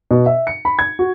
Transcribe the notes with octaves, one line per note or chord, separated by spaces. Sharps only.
B2
E5
C#7
B5
G#6
F#4